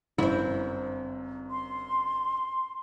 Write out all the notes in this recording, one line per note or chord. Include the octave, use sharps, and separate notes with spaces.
G1 F#2 C4 E4
C6